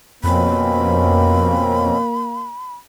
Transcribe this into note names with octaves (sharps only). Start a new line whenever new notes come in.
F2 B2 A#3 C4 C#4 B5